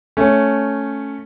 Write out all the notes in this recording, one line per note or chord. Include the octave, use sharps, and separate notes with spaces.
A3 C#4